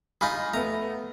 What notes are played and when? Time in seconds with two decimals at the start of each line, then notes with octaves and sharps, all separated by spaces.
0.21 D#4 F4 G#4 B5
0.54 A3 B3 A#5